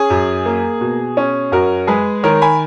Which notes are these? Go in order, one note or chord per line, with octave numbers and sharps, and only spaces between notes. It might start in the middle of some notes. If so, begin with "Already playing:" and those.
Already playing: C#4 G#4
F#2
A#3
B2
C#4
F#2 F#4 A#4
G#3 G#4 B4
D#3 A#4 C#5
G#5 B5